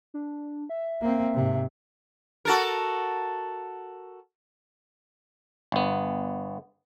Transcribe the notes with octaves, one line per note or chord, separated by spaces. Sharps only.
D4
E5
A#3 C4
G#2 C3
F#4 A4 A#4
G1 B3